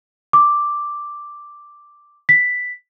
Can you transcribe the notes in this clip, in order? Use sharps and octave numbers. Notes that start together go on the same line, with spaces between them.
D6
B6